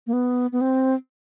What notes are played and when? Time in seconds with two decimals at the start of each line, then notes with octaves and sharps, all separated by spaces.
0.07 A#3
0.13 B3
0.52 B3
0.61 C4